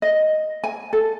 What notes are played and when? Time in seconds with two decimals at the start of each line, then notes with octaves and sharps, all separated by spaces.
0.02 D#5
0.64 G#5
0.93 A4